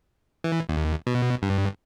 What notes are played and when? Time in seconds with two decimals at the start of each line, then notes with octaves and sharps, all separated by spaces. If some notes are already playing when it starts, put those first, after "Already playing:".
0.44 E3
0.69 D#2
1.07 B2
1.42 G2